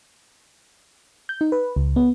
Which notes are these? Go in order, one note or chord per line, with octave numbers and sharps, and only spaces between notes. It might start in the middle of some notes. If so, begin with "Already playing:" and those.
G6
D#4
B4
C#2
B3